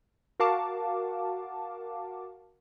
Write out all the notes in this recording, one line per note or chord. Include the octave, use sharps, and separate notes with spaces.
F#4 A#4 F5 F#5 A5 D6